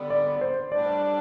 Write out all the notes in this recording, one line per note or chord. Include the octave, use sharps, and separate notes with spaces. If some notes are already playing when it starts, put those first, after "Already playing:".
Already playing: D3 G3 B3 D5
D5
C5
A2 G3 D4 D5